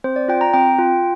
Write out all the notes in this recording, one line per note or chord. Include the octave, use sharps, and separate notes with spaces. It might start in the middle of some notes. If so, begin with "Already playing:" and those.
C4 C5
D5
F4 G5
A#5
C4 G5
F4